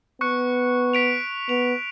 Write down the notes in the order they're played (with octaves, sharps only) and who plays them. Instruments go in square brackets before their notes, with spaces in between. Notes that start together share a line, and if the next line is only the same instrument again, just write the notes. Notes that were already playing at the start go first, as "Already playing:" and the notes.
[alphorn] B3 [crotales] C#6 F#6 C#7
[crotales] B6 D7 F7
[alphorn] B3 [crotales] F7